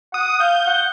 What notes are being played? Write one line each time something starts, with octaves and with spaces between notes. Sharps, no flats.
F#5 D#6
F5 G6
F#5